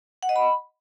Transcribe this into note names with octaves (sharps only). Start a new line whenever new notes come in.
F#5
D#5
B5